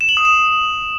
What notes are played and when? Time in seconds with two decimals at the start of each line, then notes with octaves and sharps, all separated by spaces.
0.01 E7
0.09 F#7
0.17 D#6
0.25 E7